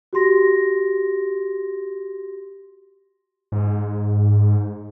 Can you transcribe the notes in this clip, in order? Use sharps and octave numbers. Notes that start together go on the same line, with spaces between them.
F#4 G4 C6 A#6
G#2